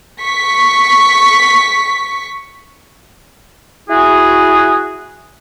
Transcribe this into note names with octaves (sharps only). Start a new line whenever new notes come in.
C#6 B6
E4 F#4 G#4